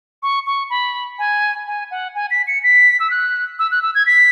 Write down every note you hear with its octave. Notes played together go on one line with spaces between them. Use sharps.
C#6
C#6
B5
G#5
G#5
F#5
G#5
B6
C#7
B6
E6
F#6
E6
F#6
E6
G#6
B6